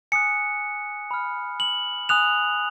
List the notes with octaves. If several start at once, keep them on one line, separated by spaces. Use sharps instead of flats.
G#5 D#6 F#6 C#7
B5 F6
F#7
G#5 D#6 F#6 F7